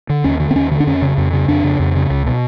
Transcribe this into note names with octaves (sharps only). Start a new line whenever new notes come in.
D3
D#2 C#4
D3
C4
D#2 C#4
D3
D4
F2 C#4
C#3
F2
C#3
F2 D4
C#3
F2
C#3
C#2
B2